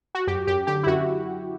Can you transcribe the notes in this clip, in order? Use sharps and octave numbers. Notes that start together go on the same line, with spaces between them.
F#4
F#2 G4
F#2 G4
D3 G4
E4
F#2 F#4